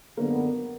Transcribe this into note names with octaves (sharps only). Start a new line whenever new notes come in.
F#2 D3 F#3 A#3 B3